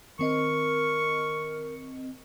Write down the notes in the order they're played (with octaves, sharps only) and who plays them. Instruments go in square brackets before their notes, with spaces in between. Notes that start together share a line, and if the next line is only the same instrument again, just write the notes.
[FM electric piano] D#3 C4 D#5 [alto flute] A#4 [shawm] C#6